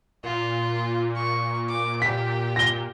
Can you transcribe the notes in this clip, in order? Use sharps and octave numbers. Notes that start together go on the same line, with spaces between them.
A#2 F4
C#6
D6
G4 B6
A#6 G7